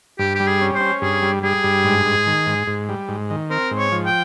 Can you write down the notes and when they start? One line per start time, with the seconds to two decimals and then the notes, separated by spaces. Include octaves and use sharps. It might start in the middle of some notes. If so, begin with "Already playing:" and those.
0.19 G2 G4
0.35 G3 G4
0.47 G#4
0.61 C#4
0.75 C5
0.81 C#4
1.02 G2 G#4
1.23 G3
1.43 G3 G#4
1.64 G2
1.84 G#2
2.06 G#2
2.27 D#3
2.47 G#2
2.67 G#2
2.89 G3
3.09 G#2
3.30 D#3
3.50 C4 A#4
3.71 G#2
3.78 C#5
3.92 F3
4.06 G5